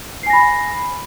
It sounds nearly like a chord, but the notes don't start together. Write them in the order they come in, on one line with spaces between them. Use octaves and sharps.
C7 G#5 A#6 B5